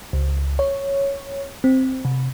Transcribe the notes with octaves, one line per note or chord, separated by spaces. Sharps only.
C#2
C#5
C4
C3